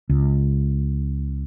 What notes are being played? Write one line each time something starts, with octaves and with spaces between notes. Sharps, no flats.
C#2